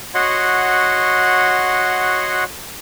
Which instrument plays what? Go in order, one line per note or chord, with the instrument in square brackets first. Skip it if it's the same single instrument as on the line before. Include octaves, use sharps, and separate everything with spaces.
[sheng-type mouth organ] F#4 C#5 D#5 F#5 C6